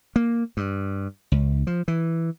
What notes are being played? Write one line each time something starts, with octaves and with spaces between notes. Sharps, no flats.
A#3
G2
C#2
F3
E3